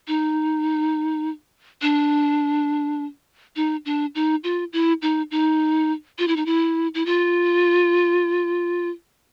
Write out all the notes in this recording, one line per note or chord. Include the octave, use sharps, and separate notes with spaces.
D#4
D4
D#4
D4
D#4
F4
E4
D#4
D#4
F4
E4
D#4
E4
E4
F4